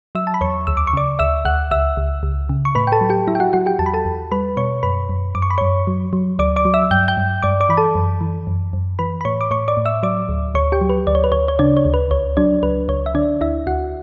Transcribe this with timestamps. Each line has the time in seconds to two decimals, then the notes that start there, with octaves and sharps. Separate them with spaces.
0.15 F#3 E5 E6
0.27 A5
0.34 B5
0.41 E2 C#5 C#6
0.67 D2 E6
0.77 D6
0.87 C#6
0.93 C#3 D5 D6
1.19 D2 E5 E6
1.45 D2 F#5 F#6
1.71 C#2 E5 E6
1.97 C#2
2.23 C#2
2.49 C#3
2.65 C#6
2.75 A2 B4 B5
2.87 G5
2.92 A4 A5
3.01 F#3
3.10 G4 G5
3.27 F#3 E4 E5
3.35 G5
3.40 F#4 F#5
3.53 F#3 F#4 F#5
3.66 G4 G5
3.79 E2 A5
3.86 B5
3.94 A4 A5
4.05 E2
4.31 G3 B4 B5
4.57 B2 C#5 C#6
4.83 F#2 B4 B5
5.09 F#2
5.35 F#2 D6
5.42 C#6
5.50 B5
5.58 F#2 C#5 C#6
5.87 F#3
6.13 F#3
6.39 D2 D5 D6
6.56 D5 D6
6.65 F#3
6.74 E5 E6
6.91 G2 G5 G6
7.08 G5 G6
7.17 G2
7.43 G2 D5 D6
7.60 D5 D6
7.69 E3 B5
7.77 A4 A5
7.95 F#2
8.21 E3
8.47 F#2
8.73 F#2
8.99 E3 B4 B5
9.21 B5
9.25 A2 C#5 C#6
9.41 D6
9.51 A2 C#5 C#6
9.68 D5 D6
9.77 A2
9.85 E5 E6
10.03 F#3 D5 D6
10.29 D2
10.55 D2 C#5 C#6
10.72 G4 G5
10.81 F#3
10.90 B4
11.07 D2 D5
11.15 C#5
11.24 B4
11.32 D2 C#5
11.48 C#5
11.59 C#3 D4 D5
11.77 C#5
11.85 D2
11.94 B4
12.11 C#2 C#5
12.37 F#3 D4 D5
12.63 C#2 B4
12.88 C#2 C#5
13.06 E5
13.14 D3 D4 D5
13.41 D2 E4 E5
13.66 D2 F#4 F#5